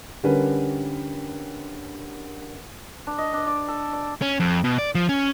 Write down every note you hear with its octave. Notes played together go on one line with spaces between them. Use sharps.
D3 G3 C#4 A#4 B4
D4
D#5
D4
D5
A4
D5
C#4
F2
B2
D5
F3
C#4